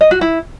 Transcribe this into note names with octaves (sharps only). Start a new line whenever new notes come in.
D#5
F#4
E4